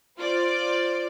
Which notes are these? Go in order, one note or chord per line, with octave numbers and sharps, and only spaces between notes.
F4 C5 D5